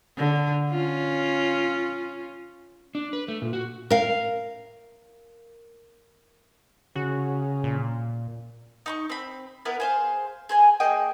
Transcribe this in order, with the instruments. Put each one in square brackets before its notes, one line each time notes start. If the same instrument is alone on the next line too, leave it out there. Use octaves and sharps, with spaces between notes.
[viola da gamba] D3
C#4 F4
[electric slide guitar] D4
B4
A3
A#2
F#4
[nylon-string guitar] A#4 F5
[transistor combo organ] C#3 [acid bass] F#4
[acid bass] A#2
[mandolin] D#4 B5 C#6
C4 B5
B3 E4 A#4 B4
G#4 C5 F5
G#4 C5 G#5
A#3 G#4 D#5 G5